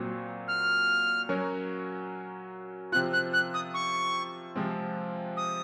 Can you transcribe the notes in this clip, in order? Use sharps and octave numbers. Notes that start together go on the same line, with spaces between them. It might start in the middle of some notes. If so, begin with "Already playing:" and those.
Already playing: A#2 F#3 C4 F#4
F6
F#3 C#4 F#4 A#4 C#5
C3 F3 C4 F4 F#6
F#6
F#6
D#6
C#6
C3 F3 G#3 C4 F4
D#6